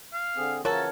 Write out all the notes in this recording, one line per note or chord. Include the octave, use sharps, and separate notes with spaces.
F5
D3 C4 G#4
C#3 E3 F3 F#4 A4 A#4 C#5 A5